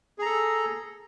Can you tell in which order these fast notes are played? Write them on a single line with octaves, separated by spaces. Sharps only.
G#4 A#5 A4